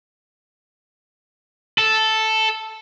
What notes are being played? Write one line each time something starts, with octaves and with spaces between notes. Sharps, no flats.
A4